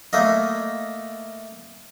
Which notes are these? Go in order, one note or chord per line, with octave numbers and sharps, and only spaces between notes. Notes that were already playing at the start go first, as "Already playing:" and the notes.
A3 A#3 D#5